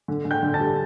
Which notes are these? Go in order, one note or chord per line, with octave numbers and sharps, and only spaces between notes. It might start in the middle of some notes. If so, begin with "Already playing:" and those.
D3
D3
G5 G6
D3
A5 A6
G3